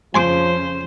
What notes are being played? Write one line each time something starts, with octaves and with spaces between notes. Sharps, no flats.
F2 C#3 F3 C#4 C5 G#5 C6 D6